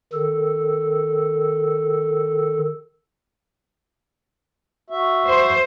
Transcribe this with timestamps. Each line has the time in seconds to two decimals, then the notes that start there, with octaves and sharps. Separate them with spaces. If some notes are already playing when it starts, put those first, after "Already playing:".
0.13 D#3 A4
4.90 F#4 E5
5.27 C5